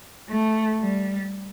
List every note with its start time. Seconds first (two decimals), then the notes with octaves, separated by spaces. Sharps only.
0.30 A3
0.80 G3